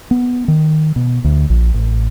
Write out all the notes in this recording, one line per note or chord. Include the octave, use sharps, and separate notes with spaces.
B3
D#3
B2
D2
A#1
A1